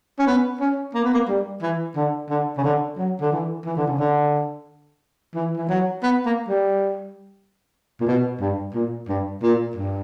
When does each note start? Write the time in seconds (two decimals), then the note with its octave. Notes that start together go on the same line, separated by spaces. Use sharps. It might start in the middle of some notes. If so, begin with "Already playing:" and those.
0.19 C#4
0.27 B3
0.60 C#4
0.94 A#3
1.04 B3
1.14 A#3
1.28 G3
1.62 E3
1.96 D3
2.29 D3
2.57 C#3
2.64 D3
2.98 F#3
3.21 D3
3.32 E3
3.65 E3
3.77 D3
3.87 C#3
3.99 D3
5.35 E3
5.57 E3
5.69 F#3
6.03 B3
6.26 A#3
6.48 G3
8.01 A#2
8.07 B2
8.41 G2
8.74 A#2
9.08 G2
9.43 A#2
9.76 G2